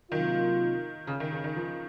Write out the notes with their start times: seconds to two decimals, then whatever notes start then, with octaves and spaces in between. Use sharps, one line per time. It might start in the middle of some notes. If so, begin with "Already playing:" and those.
0.11 C3 D#3 F#3 A#3 F4
1.07 C#3
1.20 D#3
1.32 C#3
1.44 D#3
1.56 F3